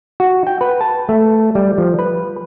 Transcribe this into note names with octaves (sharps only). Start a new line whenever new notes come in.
F#4
G5
B4
A5
A3
G3
F3
B4